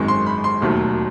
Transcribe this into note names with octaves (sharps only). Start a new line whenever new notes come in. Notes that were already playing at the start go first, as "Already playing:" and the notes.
Already playing: G#1 F#2 D#3 G#3 C#6
C6
B5
C6
E1 D#2 D#3 F#3 A3